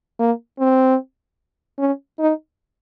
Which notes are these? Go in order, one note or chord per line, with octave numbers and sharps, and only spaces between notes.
A#3
C4
C#4
D#4